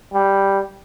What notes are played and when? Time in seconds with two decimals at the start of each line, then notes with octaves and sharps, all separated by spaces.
0.14 G3